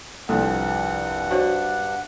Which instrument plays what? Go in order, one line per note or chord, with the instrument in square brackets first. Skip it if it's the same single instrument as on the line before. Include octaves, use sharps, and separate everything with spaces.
[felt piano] C2 F3 D4 [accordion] G2 F#5 [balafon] A4
[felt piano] D4 [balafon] F#4 C5 C#5